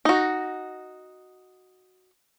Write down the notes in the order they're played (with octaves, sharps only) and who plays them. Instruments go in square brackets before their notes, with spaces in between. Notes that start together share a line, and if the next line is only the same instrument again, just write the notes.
[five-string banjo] D#4 F#4